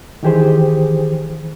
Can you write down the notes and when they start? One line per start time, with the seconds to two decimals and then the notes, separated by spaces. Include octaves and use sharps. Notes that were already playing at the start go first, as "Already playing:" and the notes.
0.23 D#3 E3 G4 G#4 C5